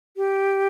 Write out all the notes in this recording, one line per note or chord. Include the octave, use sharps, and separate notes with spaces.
G4